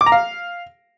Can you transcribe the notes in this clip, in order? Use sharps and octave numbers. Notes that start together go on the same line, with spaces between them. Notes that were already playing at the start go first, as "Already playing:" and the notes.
D6
A#5
F5